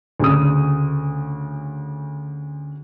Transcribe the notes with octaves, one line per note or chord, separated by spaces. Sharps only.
D2 C#3 D#6